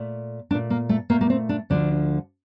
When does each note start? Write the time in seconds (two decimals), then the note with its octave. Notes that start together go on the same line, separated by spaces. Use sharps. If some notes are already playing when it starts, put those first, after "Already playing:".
Already playing: A#2 A3
0.50 A3 D4
0.54 A#2
0.70 A#3
0.89 A3
1.10 A#2 A3 A#3
1.21 A#3
1.30 C4
1.49 D4
1.70 D2 D3 F3 A3 D4